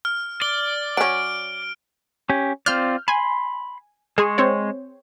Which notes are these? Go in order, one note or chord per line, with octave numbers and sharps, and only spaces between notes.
F6
D5 G7
F#3 C#4 D7
C#4 G4
C4 F4 D5 F6 G6
G#5 B5 C6
G#3 G#4 C6 C#6
C4 C5 C#5